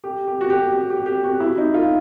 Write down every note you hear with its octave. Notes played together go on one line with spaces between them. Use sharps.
G4
G4
F#4
G4
G4
G4
G4
F#4
E4
D#4
F4